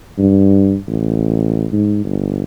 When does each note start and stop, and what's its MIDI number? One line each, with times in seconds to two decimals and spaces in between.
0.18 0.76 43
0.88 1.66 33
1.72 2.02 44
2.04 2.44 31